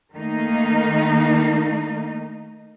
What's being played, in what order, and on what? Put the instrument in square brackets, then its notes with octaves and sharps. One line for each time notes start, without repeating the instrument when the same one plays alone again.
[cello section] D#3 A3 A#3 D#4